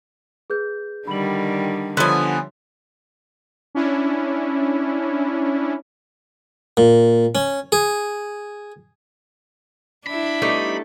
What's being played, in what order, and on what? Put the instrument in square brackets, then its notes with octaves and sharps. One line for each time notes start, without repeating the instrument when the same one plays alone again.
[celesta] G#4 B4 G6
[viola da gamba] D3 D#3 G3 [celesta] B5 F#7
[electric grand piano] D3 F3 [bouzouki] B3 G#5 [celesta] C#5 E5 C6
[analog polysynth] C#4 D4 E4
[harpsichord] A#2
C#4
G#4
[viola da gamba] D4 E4 [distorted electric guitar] B5
[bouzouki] G3 B3 D#4 [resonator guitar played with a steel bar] A3